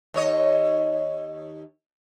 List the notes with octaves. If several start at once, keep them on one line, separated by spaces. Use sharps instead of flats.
D#2 C#5 D#5